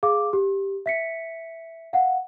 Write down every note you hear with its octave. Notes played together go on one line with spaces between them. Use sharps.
G#4 F5 D6
G4
E5 B6 C#7
F5 F#5